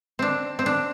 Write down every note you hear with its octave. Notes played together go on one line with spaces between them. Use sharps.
C4 D4
C4
D4